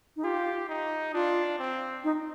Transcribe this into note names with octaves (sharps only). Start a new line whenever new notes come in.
D#4
F4 G4
D#4
D4 F4
C4
D#4